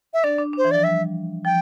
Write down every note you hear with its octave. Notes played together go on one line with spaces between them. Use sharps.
E5
D4 D5
D4
D4 C5
E3
F3 D5
G3 E5
F3 G5